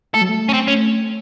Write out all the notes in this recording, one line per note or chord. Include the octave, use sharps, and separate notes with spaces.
A3 A4
F#3
A3
C#4
C4
C#4